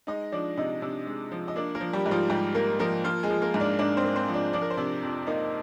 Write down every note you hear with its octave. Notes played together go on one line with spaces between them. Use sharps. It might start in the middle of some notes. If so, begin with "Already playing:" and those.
G#3 D#4 D#5
F3 D4 D5
C3 D#4 D#5
C3 D4 D5
G#3
F3
D#5
A#3 D4 D5
A#3 A#4
F3
G3 G4
G#2
F3 F4
G#2 G3 G4
A#3 A#4
F3 A#3 A#4
F3 A#3 F4
G#3 G#4
F3
A#3 A#4
G#2
D4 D5
G#2 D4 D5
C4 C5
A#3
C4 C5
F3
D4 D5
F3 D4 D5
A#4
C5
C3 D4 D5
F2
A#3 D#4 D#5